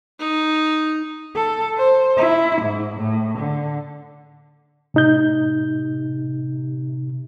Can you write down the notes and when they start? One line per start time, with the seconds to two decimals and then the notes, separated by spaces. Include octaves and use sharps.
0.20 D#4
1.36 A4
1.78 C5
2.17 E4
2.62 G#2
2.97 A2
3.39 D3
4.94 A2 C3 D#4 G6